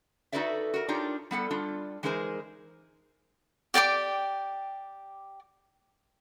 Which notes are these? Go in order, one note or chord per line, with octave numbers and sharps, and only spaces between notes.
D#4 F#4 A4 B4 D5 E5
F#4 A#4
D4 D#4 F4 G4 A#4 C#5
G3 B3 A4 F#5
G3 D4 F4
E3 G#3 D#4 G#4 A#4 C5
G4 D5 G5 D6